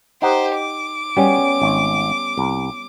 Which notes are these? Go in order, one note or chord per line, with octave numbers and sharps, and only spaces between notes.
D#4 G4 C5 F#5
D6
G3 B3 C#4
G#1
C2